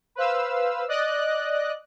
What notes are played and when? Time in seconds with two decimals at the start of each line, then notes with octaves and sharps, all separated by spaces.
0.15 B4 C5 F5 E6
0.88 D5 D#5 F#6